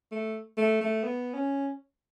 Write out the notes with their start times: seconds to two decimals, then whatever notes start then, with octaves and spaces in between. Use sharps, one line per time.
0.12 A3
0.58 A3
0.81 A3
1.04 B3
1.34 C#4